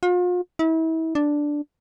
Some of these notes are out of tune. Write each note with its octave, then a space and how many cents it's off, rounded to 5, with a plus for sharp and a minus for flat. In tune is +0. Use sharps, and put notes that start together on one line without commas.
F4 +40
E4 -35
D4 +0